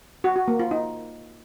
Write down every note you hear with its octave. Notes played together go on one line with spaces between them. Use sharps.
F#4
F#4
A#3
F4
D#4